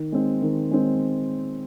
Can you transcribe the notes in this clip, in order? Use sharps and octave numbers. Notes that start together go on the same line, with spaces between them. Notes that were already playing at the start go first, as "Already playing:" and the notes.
Already playing: D#3
G#3 C4
D#3
G#3 C4